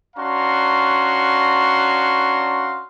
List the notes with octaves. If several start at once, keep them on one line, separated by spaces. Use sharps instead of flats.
C#4 D4 F#4 F5 A#5 C6